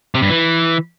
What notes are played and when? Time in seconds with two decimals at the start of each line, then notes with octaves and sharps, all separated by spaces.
0.14 C3
0.22 G2
0.30 E3